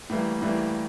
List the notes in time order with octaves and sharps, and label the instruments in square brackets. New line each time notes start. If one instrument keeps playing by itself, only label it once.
[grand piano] A2 E3 G3 A#3
A2 E3 G3 A#3